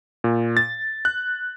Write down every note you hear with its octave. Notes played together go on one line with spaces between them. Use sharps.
A#2
A6
F#6